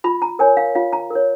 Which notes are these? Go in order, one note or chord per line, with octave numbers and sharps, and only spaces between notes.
F4 B5
A#5
A#4 C#5 G#5
F5
F4 F5
A#5
A#4 C#5